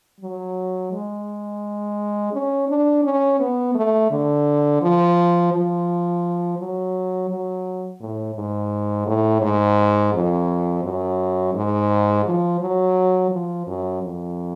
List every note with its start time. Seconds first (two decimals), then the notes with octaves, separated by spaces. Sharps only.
0.20 F#3
0.92 G#3
2.33 C#4
2.68 D4
3.04 C#4
3.40 B3
3.75 A3
4.10 D3
4.81 F3
5.52 F3
6.59 F#3
7.30 F#3
8.00 A2
8.35 G#2
9.07 A2
9.41 G#2
10.13 F2
10.83 F#2
11.54 G#2
12.25 F3
12.60 F#3
13.31 F3
13.67 F#2
14.02 F2